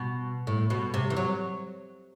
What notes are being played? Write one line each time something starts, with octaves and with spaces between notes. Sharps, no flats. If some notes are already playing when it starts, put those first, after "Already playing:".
Already playing: B2
A2
B2
C3
E3
F#3